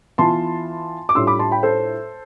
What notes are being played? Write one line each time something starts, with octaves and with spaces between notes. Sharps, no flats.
E3 B3 F4 A5 C6
D6
A2 G3 D4 F4 C6 E6
B5 D6
A5 C6
G5 B5
A4 C5